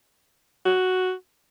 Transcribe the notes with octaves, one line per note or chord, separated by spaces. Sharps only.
F#4